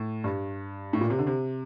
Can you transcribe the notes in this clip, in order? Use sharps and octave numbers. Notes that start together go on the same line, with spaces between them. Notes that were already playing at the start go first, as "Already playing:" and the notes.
Already playing: A2
G2
A2
A#2
C3
D3
C3